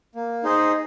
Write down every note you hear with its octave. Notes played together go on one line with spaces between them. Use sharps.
A#3
D#4 G#4 C5 D#5